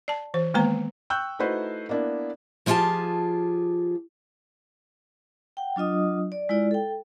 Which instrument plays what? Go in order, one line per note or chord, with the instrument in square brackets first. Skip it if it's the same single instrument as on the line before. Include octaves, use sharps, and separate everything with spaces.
[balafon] D5 A5
E3 C5
D#3 G#3 A#3 B3 B4 A#5
[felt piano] G5 C#6 E6 F#6 G6
A3 D#4 E4 F#4 B4 C5
A#3 B3 D4 E4
[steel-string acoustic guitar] F3 E4 F4 G4 G#4 A5
[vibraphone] F#5 G5
F#3 D4 F4 D#5 D#6
D5
G#3 E4 F4 D5
A4 G5